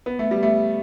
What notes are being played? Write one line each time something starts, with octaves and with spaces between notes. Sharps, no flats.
B3
A3
G3
A3